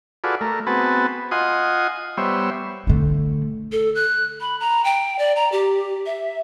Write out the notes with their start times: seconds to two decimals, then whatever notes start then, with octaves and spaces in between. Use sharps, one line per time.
0.24 F4 F#4 G#4 A4 B4 D5
0.41 A3 A#4
0.67 B3 C4 F#4 G#4 B4 A5
1.31 F4 D#5 F#5 G#5 C6 D#6
2.17 G3 B3 C5 C#5 E5
2.87 D3 A3
3.72 A4
3.95 F#6
4.41 B5
4.60 A#5
4.84 G5
5.19 D5
5.36 A#5
5.52 G4
6.06 E5